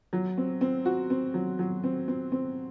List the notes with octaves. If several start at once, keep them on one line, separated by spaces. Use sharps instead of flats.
F#3
C4
C4
F#4
C4
F#3
F#3
C4
C4
C4